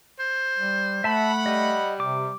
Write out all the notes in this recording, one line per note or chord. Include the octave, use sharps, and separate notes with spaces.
C5
G3
A3 E5 F#5 A5 B5
G3 D#5
C3 D6